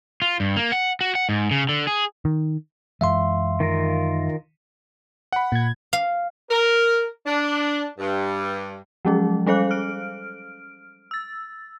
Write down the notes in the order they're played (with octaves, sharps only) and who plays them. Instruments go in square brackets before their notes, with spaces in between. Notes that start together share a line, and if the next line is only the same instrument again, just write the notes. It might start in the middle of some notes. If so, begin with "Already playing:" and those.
[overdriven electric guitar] F4
G2
A#3
F#5
F#4
F#5
G#2
C#3
D3
G#4
[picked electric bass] D#3
[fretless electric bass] F#2 E3 G#3 [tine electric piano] E5 F5 C6
[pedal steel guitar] D#3 F4 A#4
[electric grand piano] F#5 B5
[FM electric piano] A#2 G#6
[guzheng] F5
[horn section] A#4
D4
G2
[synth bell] F3 F#3 G#3 C#4 G#4
G3 C#4 A4 C5 F5 F#6
F6 D7
E6 A6